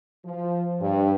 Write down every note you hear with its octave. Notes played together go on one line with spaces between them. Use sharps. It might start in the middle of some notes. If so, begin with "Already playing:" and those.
F3
G2